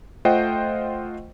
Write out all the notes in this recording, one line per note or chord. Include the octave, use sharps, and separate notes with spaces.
A3 F4 C5 D#5 F#5 G5